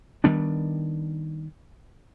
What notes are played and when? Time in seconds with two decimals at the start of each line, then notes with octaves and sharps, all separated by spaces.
0.24 D#3 G3 B3 D4